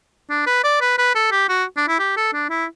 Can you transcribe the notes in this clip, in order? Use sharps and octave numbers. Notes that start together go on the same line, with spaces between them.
D4
B4
D5
B4
B4
A4
G4
F#4
D4
E4
G4
A4
D4
E4